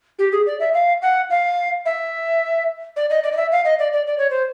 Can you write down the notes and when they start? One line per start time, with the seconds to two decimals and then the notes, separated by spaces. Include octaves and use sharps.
0.19 G4
0.32 G#4
0.46 D5
0.60 E5
0.74 F5
1.02 F#5
1.30 F5
1.85 E5
2.96 D5
3.10 D#5
3.23 D5
3.32 D#5
3.37 E5
3.52 F5
3.65 D#5
3.79 D5
3.93 D5
4.07 D5
4.18 C#5
4.30 C5